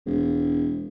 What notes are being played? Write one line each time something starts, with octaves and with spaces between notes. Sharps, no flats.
E1